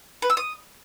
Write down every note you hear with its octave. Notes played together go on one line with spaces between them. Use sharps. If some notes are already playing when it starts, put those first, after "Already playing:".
B4
E6
D#6